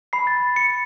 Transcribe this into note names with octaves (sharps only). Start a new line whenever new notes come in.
B5 C7
A6
C#7